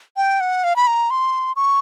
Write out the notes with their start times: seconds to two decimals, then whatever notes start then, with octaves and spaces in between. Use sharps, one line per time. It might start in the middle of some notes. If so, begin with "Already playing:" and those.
0.17 G5
0.40 F#5
0.64 F5
0.76 B5
0.87 A#5
1.10 C6
1.56 C#6